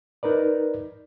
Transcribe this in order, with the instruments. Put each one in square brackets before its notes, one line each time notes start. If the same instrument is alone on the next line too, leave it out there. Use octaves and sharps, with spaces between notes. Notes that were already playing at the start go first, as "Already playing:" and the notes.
[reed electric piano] D#4 A#4 B4 D5